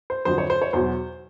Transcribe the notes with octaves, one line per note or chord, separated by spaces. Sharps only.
C5
F2 D3 F#3 C5
C#5
C5
C#5
E2 B2 F#3 C5